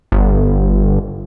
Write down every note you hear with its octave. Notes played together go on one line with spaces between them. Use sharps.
G1